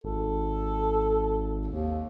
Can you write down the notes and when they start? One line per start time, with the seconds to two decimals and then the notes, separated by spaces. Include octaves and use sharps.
0.04 G#1 A4
1.67 D#2